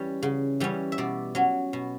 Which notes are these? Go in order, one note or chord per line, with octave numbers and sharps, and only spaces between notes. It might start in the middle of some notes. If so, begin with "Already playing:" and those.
Already playing: E3 G3 C#4
C#3
E3 G3 C#4
E5
B2 D5
F#3 C#4
B2